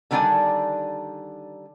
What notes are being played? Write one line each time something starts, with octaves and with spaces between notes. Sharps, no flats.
D3 D#3 G3 D4 D5 G#5